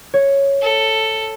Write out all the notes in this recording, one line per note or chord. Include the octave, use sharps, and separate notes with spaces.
C#5
A4